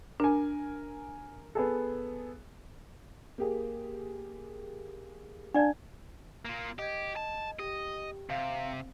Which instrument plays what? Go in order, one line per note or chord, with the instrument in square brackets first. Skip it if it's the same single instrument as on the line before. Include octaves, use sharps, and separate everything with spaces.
[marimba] D4 [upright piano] A#4 G#5
[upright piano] B3 G#4 A4
[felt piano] A#3 G4 G#4
[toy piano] D4 D5 [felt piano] F5 G#5 A5
[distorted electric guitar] A#3 F4
[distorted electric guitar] G4 [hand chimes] D#5 G#6
[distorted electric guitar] A5
[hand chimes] G4 [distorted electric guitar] D#5
[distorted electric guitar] C3 [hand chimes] F5
[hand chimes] C4